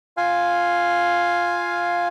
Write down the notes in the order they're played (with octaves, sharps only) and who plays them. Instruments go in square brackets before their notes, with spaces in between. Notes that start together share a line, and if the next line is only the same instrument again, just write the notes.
[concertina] F4 F5 G#5